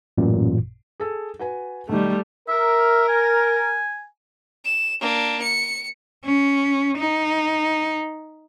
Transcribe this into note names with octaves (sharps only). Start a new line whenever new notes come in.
A1 F#2 A#2
G#4 A4
F#4 B4 G#5
B1 D#3 G3 A3
A#4 E5
G#5
E7
A#3 D4
C#7
C#4
D#4